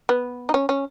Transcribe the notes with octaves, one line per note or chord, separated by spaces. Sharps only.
B3
D#4
C#4
C#4